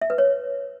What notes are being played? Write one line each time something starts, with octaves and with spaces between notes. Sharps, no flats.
E5
B4
C#5